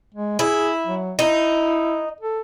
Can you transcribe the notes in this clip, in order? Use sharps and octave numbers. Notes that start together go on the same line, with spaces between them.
G#3
E4 G#4
F#3
D#4 E4
A4